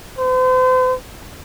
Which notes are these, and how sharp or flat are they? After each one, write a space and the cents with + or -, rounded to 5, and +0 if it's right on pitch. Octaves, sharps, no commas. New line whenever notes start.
C5 -40